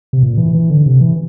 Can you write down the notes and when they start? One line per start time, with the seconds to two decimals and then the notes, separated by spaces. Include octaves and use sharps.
0.13 C3
0.23 A#2
0.38 E3
0.55 E3
0.70 D3
0.86 C3
1.01 E3